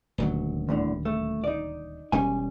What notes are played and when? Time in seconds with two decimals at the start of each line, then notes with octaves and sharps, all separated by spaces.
0.18 D#1 D2 F#3
0.69 E2 A2 D3
1.05 A3
1.44 D#4 D5
2.12 E1 G3 C#4 G#5